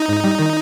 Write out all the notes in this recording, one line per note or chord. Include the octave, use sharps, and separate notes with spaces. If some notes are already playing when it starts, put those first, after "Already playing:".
Already playing: D#4
G#2
G3
D#3